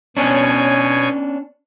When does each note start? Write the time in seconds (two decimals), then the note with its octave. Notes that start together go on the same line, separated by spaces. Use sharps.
0.17 B2 B3 C#4 D4 C#5 G#5